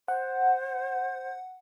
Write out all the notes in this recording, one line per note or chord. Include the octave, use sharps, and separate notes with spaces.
C5 F#5